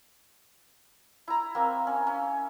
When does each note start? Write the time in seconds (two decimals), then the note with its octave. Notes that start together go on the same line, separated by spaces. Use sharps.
1.28 E4 A#5
1.55 A#3 C4
1.87 C#4
2.07 C#4